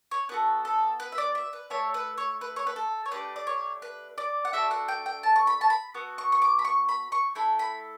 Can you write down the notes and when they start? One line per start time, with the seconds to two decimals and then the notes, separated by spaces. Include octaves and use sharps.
0.11 C#5
0.29 B3 F#4 A4 B4
0.65 A4
1.00 B4
1.12 E5
1.18 D5
1.35 E5
1.53 B4
1.70 A3 E4 A4 C#5
1.94 B4
2.18 C#5
2.41 B4
2.56 C#5
2.67 B4
2.76 A4
3.06 C#5
3.11 A3 D4 G4 B4
3.36 D5
3.47 C#5
3.82 B4
4.18 D5
4.45 F#5
4.53 A3 D4 F#4 A4 E5
4.71 F#5
4.88 G5
5.06 G5
5.23 A5
5.36 C#6
5.47 B5
5.61 A5
5.70 B5
5.94 B3 F#4 A4
6.18 C#6
6.32 C#6
6.42 D6
6.59 B5
6.65 C#6
6.89 B5
7.12 C#6
7.35 A3 E4 A4 B5
7.59 B5